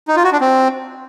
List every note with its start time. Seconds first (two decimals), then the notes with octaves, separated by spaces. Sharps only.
0.08 D#4
0.16 F4
0.24 F#4
0.32 D4
0.41 C4